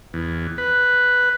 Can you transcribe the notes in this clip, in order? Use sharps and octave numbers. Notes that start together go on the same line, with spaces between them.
E2
B4